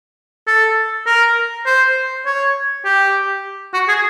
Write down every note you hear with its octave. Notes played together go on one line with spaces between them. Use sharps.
A4
A#4
C5
C#5
G4
F#4
G#4